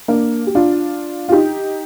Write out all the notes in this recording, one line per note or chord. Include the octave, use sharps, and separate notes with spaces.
A#3 D4
G4
D4 F4
F4
D#4 G4